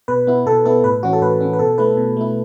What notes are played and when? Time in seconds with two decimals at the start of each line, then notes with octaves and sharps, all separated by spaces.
0.08 B2 B4
0.27 B3 E4
0.46 B2 A4
0.65 B3 E4 A4
0.84 A2 B4
1.03 E3 C#4 F#4
1.13 A4
1.21 A2 B4
1.41 E3 C#4
1.53 B4
1.59 B2 A4
1.78 A3 E4 B4
1.97 B2
2.17 A3 E4